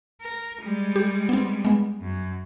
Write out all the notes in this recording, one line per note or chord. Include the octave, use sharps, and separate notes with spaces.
A#4
G3 G#3
G4
B3 C4
G#3 B3
F#2